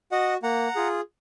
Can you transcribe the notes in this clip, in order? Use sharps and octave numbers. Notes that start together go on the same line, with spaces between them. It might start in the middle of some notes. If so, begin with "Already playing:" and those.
F#4 D#5 F#5
A#3 F#5 A#5
F4 G#4